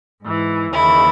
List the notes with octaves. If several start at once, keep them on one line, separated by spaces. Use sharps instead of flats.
G#2 E3
D#2 C#3 E3 E4